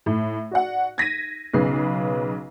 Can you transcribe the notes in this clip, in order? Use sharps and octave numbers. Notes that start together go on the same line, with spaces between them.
A2
F#4 D5 F#5
G#6 A#6 B6 D#7
B1 C#3 B3 B4 C7